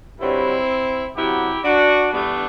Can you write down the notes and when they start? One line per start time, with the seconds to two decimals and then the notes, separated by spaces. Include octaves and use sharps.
0.20 G2 D3 F#3 C4 E4
1.16 C3 F#3 B3 E4 G4
1.63 D4 F#4
2.11 G2 E3 A3 B3 D4